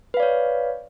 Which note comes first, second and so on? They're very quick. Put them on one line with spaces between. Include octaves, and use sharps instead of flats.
B4 F5 D5 C#5